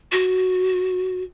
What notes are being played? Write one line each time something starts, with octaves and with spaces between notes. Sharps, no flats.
F#4